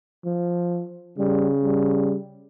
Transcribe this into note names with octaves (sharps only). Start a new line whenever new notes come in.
F3
C#3 G3
G3